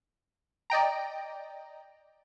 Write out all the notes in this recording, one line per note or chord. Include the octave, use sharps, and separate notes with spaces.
D5 D#5 G5 A#5